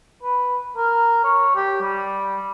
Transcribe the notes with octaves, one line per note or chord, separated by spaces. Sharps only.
B4
A#4
C#5
G4
G3